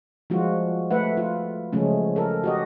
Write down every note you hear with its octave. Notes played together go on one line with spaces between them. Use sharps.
F3 G3 G#3 F4 F#4
A3 B4 E5 F#5
F4
C#3 F3 F#3 G#3 A3 C#4
A4 A#4
F#4 G4 D#5